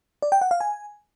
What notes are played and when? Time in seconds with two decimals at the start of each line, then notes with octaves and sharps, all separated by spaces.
0.22 D5
0.32 G5
0.41 F#5
0.51 F5
0.60 G#5